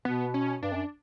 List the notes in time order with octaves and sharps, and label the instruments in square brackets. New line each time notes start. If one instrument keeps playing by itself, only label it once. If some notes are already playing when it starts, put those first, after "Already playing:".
[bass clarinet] B2 [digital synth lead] B3
[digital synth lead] C#4
[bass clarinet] G2 [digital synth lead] D4
[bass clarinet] F#2